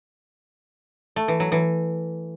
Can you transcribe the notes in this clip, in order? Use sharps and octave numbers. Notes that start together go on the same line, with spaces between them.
A3
E3
F#3
E3